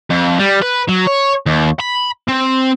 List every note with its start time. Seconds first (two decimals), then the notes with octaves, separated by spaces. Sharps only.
0.10 F2
0.39 G3
0.62 B4
0.88 F#3
1.07 C#5
1.46 D#2
1.80 B5
2.29 C4